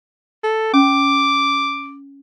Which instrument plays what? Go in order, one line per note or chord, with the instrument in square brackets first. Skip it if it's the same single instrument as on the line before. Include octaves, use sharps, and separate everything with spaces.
[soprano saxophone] A4
[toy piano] C#4 [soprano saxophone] D6